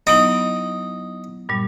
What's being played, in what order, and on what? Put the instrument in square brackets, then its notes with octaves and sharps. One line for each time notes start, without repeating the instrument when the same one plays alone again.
[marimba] F#3 B3 E4 [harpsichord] D#4
[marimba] G2 A#2 G3